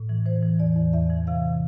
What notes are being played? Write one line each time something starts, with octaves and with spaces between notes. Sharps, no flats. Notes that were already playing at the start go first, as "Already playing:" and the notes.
Already playing: A2
E3
E3 C5
E3
E2 D5
E2
E2 E5
E3
C3 F5